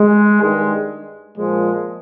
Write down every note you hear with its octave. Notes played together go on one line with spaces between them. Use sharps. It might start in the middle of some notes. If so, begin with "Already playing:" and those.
Already playing: G#3
G2 D#3 G#3
A#2 F3 G#3